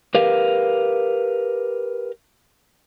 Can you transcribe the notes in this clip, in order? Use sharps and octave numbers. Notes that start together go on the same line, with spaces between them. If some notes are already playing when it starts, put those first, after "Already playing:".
G4 A#4 B4 F5